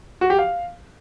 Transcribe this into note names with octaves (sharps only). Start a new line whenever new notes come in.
F#4
G4
F5